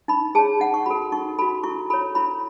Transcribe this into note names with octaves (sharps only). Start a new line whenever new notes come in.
D#4 B5
G#4 C#5 A5
D#4 F#5
C#6
F#4 A4 B5
D#4 C#6
F#4 A4 B5
E4 C#6
A4 C#5 B5
E4 B5